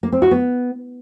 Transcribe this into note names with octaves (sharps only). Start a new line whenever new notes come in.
A#3
C4
F#4
B3